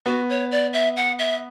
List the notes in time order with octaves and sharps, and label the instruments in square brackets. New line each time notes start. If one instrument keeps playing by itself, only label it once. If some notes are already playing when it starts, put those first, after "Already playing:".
[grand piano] B3 [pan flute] F#4
[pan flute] C#5
D5
E5
F#5
E5